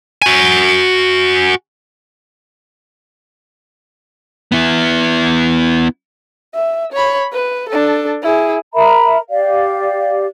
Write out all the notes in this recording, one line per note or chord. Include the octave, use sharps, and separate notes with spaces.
F#4 G#5
B3 E4
E5
C#5 B5
B4
D4 A4
E4 G#4
A#4 E5 A#5 B5
G4 D5 F5